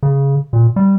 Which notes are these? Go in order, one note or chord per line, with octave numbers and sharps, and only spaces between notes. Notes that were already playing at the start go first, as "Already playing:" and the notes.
C#3
A#2
G3